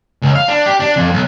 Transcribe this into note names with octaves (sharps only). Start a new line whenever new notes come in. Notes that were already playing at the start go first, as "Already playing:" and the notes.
C#2
F5
D4
G4
D4
F2
B1